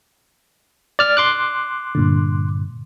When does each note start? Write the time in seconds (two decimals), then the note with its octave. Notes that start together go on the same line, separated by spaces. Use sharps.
0.99 D5 F6
1.17 C6 D6 F#6
1.95 G2 A#2 D3